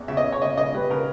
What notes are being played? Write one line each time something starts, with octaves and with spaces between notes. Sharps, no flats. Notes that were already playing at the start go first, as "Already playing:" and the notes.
Already playing: E2
C#3 E5
D#5
C#3
C#5
C#3 D#5
C#3 D#5
G3 B4
C#3 A#4